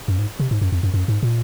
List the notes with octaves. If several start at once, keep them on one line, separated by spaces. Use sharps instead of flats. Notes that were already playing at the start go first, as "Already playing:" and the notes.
F#2
G#2
C3
G#2
F#2
F2
F#2
F#2
G#2
A#2